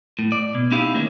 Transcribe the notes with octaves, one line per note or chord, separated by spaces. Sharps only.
A2
D5
B2
C#4 D#4 E4 G4 F5
D2 D#3 A#3 C#4